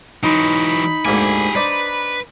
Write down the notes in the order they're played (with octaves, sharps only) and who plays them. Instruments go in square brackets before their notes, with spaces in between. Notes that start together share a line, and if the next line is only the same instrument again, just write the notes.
[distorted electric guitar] E3 F#3 [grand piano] D#4 [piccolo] B5 [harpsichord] C6
[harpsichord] D2 G#2 A#3 [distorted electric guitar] G4 G#5
[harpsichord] D4 D#4 C5 [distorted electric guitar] B4